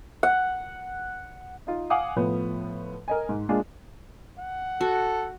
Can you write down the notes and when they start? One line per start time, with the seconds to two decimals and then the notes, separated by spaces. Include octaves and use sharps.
0.23 F#5
1.67 D#4 F4
1.90 F5 F#5 G#5 D6 D#6
2.16 A2 F3 B3
3.08 A#4 D#5 G#5
3.29 G#2
3.49 G#3 A#3 D4 F4 G#4
4.39 F#5
4.81 F#4 A4